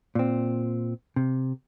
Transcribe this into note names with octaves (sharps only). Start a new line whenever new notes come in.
A#2 C4
C3